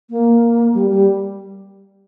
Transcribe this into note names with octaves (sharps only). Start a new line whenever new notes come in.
A#3
G3
G3